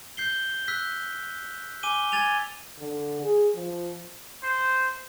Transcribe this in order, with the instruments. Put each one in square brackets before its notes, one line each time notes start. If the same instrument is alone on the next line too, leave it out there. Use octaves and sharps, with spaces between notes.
[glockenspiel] G6 C7 G7
E6 F#6 B6
G#5 D6 D#7 G7
G#5 G#6 A6 D#7 F7
[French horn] D3
G#4
F3
[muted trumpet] C5